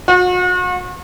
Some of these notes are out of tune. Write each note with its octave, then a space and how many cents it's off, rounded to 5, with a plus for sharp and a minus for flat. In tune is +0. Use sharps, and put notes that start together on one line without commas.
F#4 -40